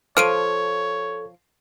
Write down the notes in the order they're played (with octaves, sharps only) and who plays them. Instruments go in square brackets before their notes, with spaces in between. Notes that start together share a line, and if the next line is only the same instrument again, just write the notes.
[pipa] F3 [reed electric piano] A4 [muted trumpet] C#5 [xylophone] F6 D7 D#7